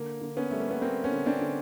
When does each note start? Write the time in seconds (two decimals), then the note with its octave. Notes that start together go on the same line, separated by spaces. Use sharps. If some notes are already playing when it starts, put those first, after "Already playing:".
Already playing: D3 A#3
0.21 D3
0.37 B3 C#4
0.50 G3 A3
0.60 A#3
0.71 B3
0.81 G3 A#3 C4
1.04 B3 C#4
1.12 D3
1.26 C4 D4
1.41 D3